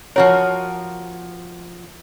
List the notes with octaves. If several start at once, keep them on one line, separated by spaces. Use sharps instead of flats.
F3 F#4 A#4 C#5